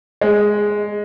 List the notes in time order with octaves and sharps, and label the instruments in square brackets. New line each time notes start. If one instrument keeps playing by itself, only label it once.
[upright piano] G#3